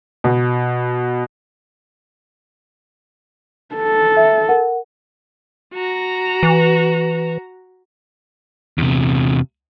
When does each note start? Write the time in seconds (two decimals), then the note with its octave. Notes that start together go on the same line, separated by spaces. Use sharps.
0.24 B2
3.75 A4
4.17 E5
4.49 A#4 F#5
5.74 F#4 A#5
6.43 E3
8.78 E2 C3